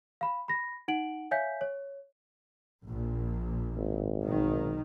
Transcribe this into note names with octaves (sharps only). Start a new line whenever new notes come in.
F5 B5
B5 A#6
D#4 F#5 D7 F#7
C#5 E5 F5 G#5 G6 B6
C#5
A#1 A#2
G#1
B1 D#3